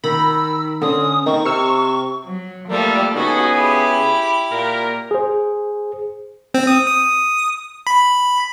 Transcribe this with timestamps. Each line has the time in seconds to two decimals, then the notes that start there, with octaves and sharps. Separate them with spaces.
0.04 D#3 B5 E6 A#6
0.82 D3 C4 C#4 D#6
1.26 D#3 C4 C#6
1.46 C3 E6 F6 C#7
2.25 F#3
2.69 F3 G3 A3 A#3 F4 A4
3.14 C#3 B3 D#4 F#4 G#4 A4
3.53 E4 G4 B5
4.52 A#2 A#4
5.11 G#4 C5
6.54 C4
6.67 D#6
6.87 D#6
7.87 B5